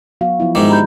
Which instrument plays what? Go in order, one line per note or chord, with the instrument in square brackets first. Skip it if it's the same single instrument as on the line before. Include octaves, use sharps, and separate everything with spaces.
[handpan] F#3 B3 F#4 [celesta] F5
[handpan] F3 B3 E4
[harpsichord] G#2 D#3 [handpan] G#3 D#4 E5 [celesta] D#5 D6
[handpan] D4 G4 [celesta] A#5 B5 G6